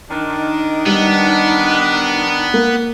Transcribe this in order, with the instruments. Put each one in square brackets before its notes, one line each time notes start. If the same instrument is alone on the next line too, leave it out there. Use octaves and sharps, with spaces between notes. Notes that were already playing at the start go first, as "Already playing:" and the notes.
[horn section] D#3 D4 [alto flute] D#4
[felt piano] G3 [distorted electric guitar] B3
[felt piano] A#3